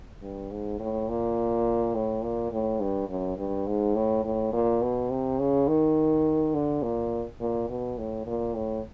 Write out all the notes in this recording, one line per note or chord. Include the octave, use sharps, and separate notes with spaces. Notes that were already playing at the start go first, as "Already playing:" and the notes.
G2
G#2
A2
A#2
A2
A#2
A2
G2
F#2
G2
G#2
A2
A2
A#2
B2
C3
C#3
D#3
D3
A#2
A#2
B2
A2
A#2
A2